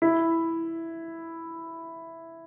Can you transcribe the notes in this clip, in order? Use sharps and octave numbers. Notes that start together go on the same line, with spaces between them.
E4